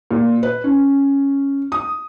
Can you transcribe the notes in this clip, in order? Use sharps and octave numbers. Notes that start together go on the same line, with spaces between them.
A#2
B4
C#4
D#6